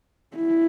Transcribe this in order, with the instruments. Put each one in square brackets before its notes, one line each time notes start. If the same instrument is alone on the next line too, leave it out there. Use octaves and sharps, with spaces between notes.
[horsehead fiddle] E4